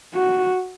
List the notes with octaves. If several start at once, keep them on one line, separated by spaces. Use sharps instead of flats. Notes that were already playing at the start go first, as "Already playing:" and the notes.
F#4